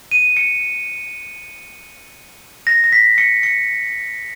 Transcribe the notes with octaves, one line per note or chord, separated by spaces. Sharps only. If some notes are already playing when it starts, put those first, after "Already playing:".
D#7
C#7
A#6
A#6
B6
C#7
C#7